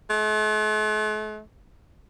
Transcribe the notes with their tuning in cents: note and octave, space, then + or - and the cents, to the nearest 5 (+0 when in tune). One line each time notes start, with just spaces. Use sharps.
A3 -45